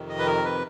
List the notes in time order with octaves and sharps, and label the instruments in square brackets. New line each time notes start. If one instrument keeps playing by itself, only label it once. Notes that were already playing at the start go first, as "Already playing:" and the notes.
Already playing: [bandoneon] F2 C3 D#3
D#5
B4
A#4
B4